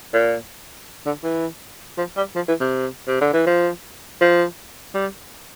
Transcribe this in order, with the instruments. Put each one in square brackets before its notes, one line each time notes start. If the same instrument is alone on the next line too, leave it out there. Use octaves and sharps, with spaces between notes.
[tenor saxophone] A#2
D3
E3
F3
G3
F3
E3
C3
C3
D3
E3
F3
F3
G3